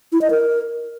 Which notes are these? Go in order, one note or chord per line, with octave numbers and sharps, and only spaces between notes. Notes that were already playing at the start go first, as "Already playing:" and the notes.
E4
D#5
A#4